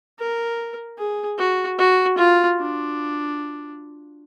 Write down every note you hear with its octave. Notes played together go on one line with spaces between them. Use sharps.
A#4
G#4
F#4
F#4
F4
D4